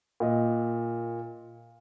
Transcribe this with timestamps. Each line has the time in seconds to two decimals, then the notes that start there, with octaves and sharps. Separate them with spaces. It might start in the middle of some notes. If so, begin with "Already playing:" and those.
0.20 A#2 D#5